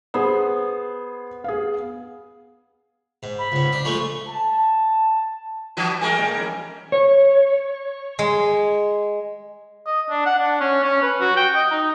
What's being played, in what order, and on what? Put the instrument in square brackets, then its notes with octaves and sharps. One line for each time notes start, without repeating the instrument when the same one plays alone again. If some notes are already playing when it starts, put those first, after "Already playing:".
[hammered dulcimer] B3 [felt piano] G#4 C5
[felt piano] G#4 F5
[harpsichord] G#2
[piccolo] B5
[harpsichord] C#2 G#2
D4
[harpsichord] F3 G#3 A3 [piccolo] C#6
[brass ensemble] A5
[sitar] E3 F#4 B4
[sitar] G3 G#3 A#4 [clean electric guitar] B4 G#5
[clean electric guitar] A#2 C#3 D#5
E3 F3 C#4
[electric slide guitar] C#5
[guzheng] G#3
[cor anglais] D#5
D4
F#5
D4
C#4
C#4
B4
F#4
G5
D#5
D#4